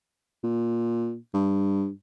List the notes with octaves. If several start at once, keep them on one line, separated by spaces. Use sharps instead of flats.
A#2
G2